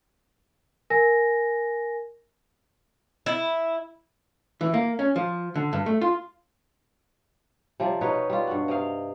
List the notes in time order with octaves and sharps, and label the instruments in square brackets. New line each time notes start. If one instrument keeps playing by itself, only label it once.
[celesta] A#4 G#5 A#6
[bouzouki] E4
[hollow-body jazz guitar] E3
A#3
C#4
F3
D3
G2
A3
F4
[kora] C3 F3 G3
B2 D#4 B4 C#5
G3 F4
G2 F#4
C3 D#5 F5